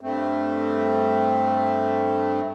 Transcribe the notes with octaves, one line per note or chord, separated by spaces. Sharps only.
G2 A3 C4